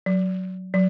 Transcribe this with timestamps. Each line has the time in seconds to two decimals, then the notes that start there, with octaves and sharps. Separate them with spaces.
0.06 F#3
0.74 F#3